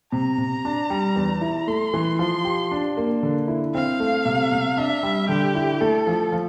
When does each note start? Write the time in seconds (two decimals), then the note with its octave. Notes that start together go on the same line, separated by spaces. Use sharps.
0.12 C3 A#5
0.38 C3
0.65 D4
0.90 G3
1.16 E2
1.41 E4
1.67 A3 C6
1.94 E3
2.19 F3 C6
2.45 G4
2.71 D4
2.97 A#3
3.23 D3
3.48 E4
3.75 C4 F5
4.00 A3
4.26 C3
4.52 C3
4.77 D4 E5
5.03 G3
5.29 D3 G4
5.55 E4
5.81 A3 A4
6.07 F3
6.32 F3